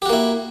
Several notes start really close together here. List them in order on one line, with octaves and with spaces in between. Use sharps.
G4 F#4 A#3 E4